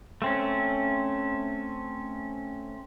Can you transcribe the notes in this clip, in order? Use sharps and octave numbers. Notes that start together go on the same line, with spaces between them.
A3 C4 C#4